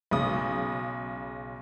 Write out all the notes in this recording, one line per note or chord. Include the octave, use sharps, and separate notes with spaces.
B1 C#3 D#6